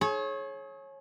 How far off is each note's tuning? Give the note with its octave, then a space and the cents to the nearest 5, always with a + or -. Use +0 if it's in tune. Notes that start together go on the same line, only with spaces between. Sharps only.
G#4 +35 C#5 -25